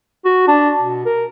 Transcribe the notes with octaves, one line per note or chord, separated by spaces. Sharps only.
F#4
D4
B2
A#4